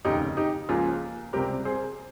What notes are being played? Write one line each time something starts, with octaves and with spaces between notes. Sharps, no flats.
F1 D#2 C#3 D#4 G4
D#4 G4
C#2 C#3 F3 A#3 F4 G#4
C#2 C3 G3 C4 G4 A#4
G#4 C5